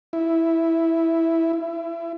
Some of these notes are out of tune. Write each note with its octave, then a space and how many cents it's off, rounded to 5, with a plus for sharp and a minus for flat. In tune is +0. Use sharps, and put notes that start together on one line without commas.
E4 -5
E4 +30